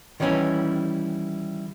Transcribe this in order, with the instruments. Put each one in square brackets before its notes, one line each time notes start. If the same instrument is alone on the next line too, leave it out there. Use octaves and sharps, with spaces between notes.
[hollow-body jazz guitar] D#3 E3 G3 C#4 E4